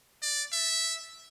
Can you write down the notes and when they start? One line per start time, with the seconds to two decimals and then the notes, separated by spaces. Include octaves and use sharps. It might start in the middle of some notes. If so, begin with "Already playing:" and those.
0.22 D5
0.52 E5